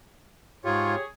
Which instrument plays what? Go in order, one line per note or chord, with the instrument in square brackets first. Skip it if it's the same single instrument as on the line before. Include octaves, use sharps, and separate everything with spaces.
[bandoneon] G#2 F4 [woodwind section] G4 G#4 C#5